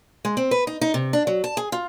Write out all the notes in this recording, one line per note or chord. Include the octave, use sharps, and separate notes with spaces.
G#3
C4
B4
D#4
D#4
C3
D4
F#3
A5
G#4
F4